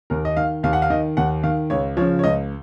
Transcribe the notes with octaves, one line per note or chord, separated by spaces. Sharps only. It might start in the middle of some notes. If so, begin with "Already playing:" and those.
D#2 A#4
D#5
D#3 F5
D#2 F5
F#5
F5
D#3 D#5
D#2 F#5
D#3 F5
C#2 C#5
C#3 F3 C#5
C#5
C#2 D#5